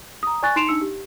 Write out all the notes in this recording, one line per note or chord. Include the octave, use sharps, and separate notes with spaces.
A#5 D#6
D5 G#5 C#6 F#6 A6
D#4 C6 C7 D7 E7 F7
D4 D#4 E6 C#7
G4